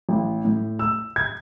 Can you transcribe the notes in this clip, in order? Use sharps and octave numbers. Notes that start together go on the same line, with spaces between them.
A1
A2
E6
G#6